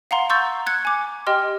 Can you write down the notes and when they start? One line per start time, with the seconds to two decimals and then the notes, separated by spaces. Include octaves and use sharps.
0.11 F5 F#5 A#5 C6
0.29 A#5 C6 C#6 E6 G6 A6
0.67 F#6 G#6 C#7
0.85 G#5 D6
1.27 G4 D#5 G5 C6 F6